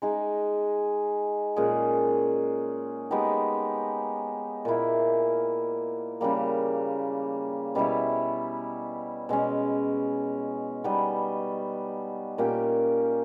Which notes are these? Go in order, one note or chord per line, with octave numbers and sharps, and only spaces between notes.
G#3 D#4 G#4
A#2 G#3 C#4 G#4
G#3 B3 D#4 G4
A#2 A#3 E4
C#3 G3 A#3
B2 G3 C#4 E4
B2 G#3 C#4
G3 B3 D#4
A#2 A#3 C#4 G4